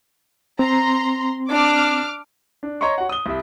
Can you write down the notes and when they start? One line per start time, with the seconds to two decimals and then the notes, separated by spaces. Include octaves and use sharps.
0.59 C4 A#5 C6
1.50 D4 D6 F6
2.63 D4
2.81 C#5 D#5 A#5 C6 C#6
2.98 F#4 C#5 F#5
3.09 D#6 G7
3.26 C2 E5